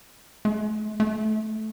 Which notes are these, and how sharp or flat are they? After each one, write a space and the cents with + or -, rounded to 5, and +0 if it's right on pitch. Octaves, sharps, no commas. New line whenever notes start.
A3 -40
A3 -15